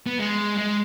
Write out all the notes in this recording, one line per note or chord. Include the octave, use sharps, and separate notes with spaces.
B3
G#3
G#3